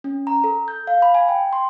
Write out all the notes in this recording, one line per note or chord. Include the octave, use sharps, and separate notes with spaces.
C#4
A#5
A4
G6
F5
B5
G#5
G5
C6